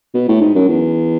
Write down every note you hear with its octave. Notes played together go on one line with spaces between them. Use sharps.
B2
A2
G#2
F#2
E2